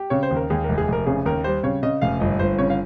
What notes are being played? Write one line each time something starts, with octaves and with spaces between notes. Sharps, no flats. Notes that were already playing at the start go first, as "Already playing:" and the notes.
Already playing: G4
C#3 C#5
C5
D#2
A#4
D#2 G#4
F1 A#4
G#4
F1 A#4
C#3 G#4
D#2 A#4
G3 C5
C#3 C#5
C#3 D#5
F1 F5
G1 D#5
G1 C5
C#3 C#5
F5